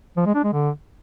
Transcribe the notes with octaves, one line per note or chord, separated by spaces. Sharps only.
F3
G#3
D4
G#3
D3